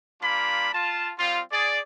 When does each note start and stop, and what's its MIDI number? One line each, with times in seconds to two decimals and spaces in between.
0.22 0.69 55
0.22 0.69 58
0.22 0.69 62
0.22 0.69 65
0.22 0.69 83
0.73 1.12 65
0.73 1.12 81
1.18 1.41 55
1.18 1.41 60
1.18 1.41 65
1.51 1.79 68
1.51 1.79 74